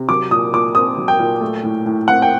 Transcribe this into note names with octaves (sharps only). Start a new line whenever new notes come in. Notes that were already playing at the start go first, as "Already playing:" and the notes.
Already playing: C3
F#3 D6
A#2 D#6
A#2 D6
C4 D#6
F#3
G5
A#2
A3
A2
A2
C4 F#5
G5